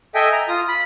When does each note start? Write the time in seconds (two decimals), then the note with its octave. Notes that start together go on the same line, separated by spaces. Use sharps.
0.15 A4 D#5 E5 G5 G#5
0.32 A#5
0.48 F4 D#6
0.68 B5